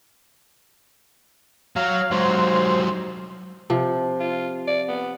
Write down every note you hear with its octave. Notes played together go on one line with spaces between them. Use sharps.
F#3 F5
G#2 F#3 C5
C3 F3
F4
D5
B3